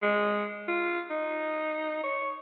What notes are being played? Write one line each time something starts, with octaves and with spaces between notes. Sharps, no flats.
G#3
F4
D#4
C#5